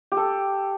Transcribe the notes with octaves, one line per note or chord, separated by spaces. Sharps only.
G4
A4